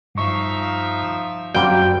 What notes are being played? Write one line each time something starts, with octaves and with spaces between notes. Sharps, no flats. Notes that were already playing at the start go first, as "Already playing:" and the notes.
G2 F3 D#4 E5 C#6
F#2 G3 A#3 C4 F#4 G5 G6